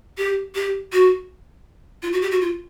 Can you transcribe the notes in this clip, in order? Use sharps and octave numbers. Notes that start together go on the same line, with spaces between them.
G4
G4
F#4
F4
F#4
G4
F#4
F4